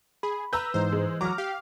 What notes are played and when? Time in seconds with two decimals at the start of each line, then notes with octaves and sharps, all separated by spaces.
0.23 G#4 B5
0.53 B4 A#5 E6 G6
0.74 G#2 E3 C5
0.92 G#3
1.21 F#3 A#5 D6 F6
1.38 G4 F5